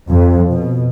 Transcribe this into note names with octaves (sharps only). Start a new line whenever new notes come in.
F2
B2